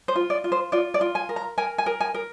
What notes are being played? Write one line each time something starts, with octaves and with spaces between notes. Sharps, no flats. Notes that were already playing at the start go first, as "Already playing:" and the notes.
C5
F4
D5
F4
C5
F4 D5
D5
F4
G#5
A#4
A#5
A#4 G#5
G#5
A#4
G#5
A#4